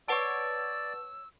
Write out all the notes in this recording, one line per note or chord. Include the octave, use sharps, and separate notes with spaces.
B4 C#5 D5 F#5 A5 D6 E6